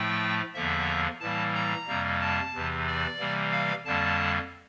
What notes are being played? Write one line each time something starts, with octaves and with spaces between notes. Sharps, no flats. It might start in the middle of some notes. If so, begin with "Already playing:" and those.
Already playing: A2 F3 A3 G5
E2 D3 F3 A#3 E5
A2 E3 G3 A#3 A5
A#5
F2 C3 G3 A#3
A5
E2 C3 E3
D5
C3 E3 G3 A#3
F5
F2 D3 G3 A#3 A5